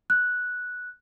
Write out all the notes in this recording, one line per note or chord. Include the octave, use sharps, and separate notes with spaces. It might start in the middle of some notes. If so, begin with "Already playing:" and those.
F#6